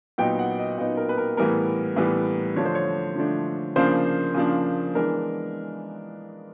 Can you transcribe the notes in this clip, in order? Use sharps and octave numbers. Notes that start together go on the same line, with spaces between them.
A#2 F#3 B3 D#4 G5
F#5
D#5
A#2 F#3 B3 D#4 D#5
A#4
B4
A#4
A2 E3 G3 B3 A#4
A2 E3 G3 B3
D3 F3 A3 D4 C#5
C5
C#5
D3 F3 A3 D4
C#3 F3 A#3 D4 C5
C#3 F3 A#3 D4
E3 G#3 B3 D4 A#4